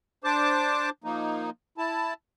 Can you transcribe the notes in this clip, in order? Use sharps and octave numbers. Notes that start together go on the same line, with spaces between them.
D4 C5 A5 D6
F3 A#3 D#4
E4 A5